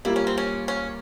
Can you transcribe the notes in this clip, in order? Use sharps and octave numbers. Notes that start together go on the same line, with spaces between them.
G3 A#3 E4 F4
C#4
C4
C#4
C#4